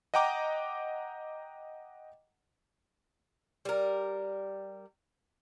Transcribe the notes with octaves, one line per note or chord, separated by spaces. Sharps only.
D#5 F#5 G5 A#5 D6
G3 A#4